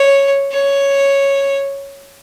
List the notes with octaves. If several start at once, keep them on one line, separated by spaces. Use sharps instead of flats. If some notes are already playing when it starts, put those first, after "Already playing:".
Already playing: C#5
C#5